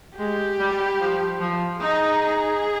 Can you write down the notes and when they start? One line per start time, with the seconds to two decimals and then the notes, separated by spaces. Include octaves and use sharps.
0.18 G#3 G4
0.59 G3
1.00 F3
1.40 F3
1.81 D#4 G#4